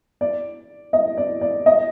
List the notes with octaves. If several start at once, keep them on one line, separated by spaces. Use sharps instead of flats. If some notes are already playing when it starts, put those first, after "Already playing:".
D5
D#5
D5
D5
D#5